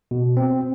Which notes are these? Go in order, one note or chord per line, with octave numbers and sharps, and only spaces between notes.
B2
C4